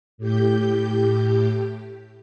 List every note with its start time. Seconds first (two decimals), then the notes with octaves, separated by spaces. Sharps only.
0.18 A2 G4 G6